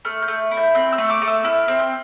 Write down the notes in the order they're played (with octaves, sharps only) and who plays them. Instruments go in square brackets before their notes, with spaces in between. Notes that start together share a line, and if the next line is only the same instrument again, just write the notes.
[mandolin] A3 F6
G6
A3
E4
G6
C4 G6
E6
A3
D6
A3
E6
E4 F6
C4
G6